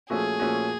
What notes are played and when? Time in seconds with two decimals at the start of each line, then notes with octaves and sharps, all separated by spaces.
0.10 A#2 F3 A3 C#4 F#4 G#4
0.40 A#2 F3 A3 C#4 F#4